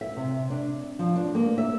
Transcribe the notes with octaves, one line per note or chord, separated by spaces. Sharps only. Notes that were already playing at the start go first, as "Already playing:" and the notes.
E5
C3
D4
F3
D4
A#3
E5